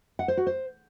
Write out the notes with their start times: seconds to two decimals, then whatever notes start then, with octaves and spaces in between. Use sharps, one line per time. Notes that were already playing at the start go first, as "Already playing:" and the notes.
0.19 F#5
0.28 C5
0.37 F#4
0.47 C5